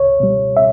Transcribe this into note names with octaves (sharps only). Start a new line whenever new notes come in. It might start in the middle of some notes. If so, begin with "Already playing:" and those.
Already playing: C#2 C#5
B2 G3
E5